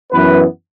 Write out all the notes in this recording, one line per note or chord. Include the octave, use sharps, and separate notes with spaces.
F#2 E3 B3 B4